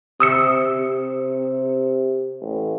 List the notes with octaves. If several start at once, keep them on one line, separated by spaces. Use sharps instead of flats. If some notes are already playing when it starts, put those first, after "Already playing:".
C3 D#6 E6 C#7
C3
A1